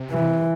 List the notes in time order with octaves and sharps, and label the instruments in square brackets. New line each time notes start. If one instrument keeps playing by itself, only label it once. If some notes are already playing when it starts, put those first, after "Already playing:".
Already playing: [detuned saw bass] C3
[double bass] E3